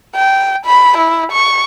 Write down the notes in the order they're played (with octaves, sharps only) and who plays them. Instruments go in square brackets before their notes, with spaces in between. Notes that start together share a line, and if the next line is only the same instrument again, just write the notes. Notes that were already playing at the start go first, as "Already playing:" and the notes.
[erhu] G5
B5
E4
C#6